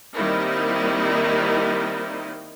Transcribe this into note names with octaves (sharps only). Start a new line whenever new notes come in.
D#3 G3 A#3 C4 D#4 E4